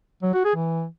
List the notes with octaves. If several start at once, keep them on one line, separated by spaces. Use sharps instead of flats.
F#3
F#4
G#4
E3